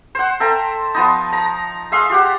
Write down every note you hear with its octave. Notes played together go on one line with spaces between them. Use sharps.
C5 F#5
A4 E5 G5 A#5
F3 B3 D#4
A#5
G#4 E5 F5 C6
F4 G4 F#5